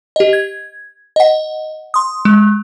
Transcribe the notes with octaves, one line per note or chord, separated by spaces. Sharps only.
G4 D#5
G#6
D#5 F#5
C6 D#6
G#3